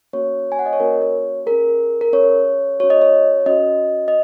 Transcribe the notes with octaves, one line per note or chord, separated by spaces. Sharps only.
A#3 C#4 F#4 C#5
G#5
F#5
D#5
C#5
A#3 C#4 F#4 A#4
C#5
C#4 G#4 A#4
A#4
C#4 G#4 C#5
C#4 F#4 C#5
D#5
C#5
C#4 F#4 D#5
D#5